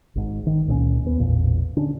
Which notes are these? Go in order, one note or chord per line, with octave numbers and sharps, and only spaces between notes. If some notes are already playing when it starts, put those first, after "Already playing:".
G#1 G#2
D#3
C#2 A#2 A3 C#4
D#2 B3
A1 E2 A#2
D3 C#4 D4